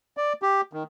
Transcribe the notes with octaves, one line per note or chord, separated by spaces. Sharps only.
D5
G4
D#3